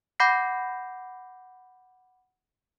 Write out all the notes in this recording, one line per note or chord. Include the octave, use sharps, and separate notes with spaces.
F#5 B5 D6 G6 A#6 C7